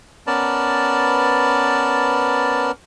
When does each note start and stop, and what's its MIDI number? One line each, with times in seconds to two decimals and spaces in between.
0.27 2.71 59
0.27 2.71 61
0.27 2.71 70
0.27 2.71 71
0.27 2.71 74
0.27 2.71 81